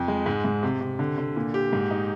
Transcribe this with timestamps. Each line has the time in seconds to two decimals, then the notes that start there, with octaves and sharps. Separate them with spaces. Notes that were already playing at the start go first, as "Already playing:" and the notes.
Already playing: F2
0.08 G#3
0.26 G#2
0.45 G#2
0.63 C3
0.81 C3
0.99 D3
1.18 D3
1.36 A#2
1.54 G4
1.73 G#2
1.91 D#4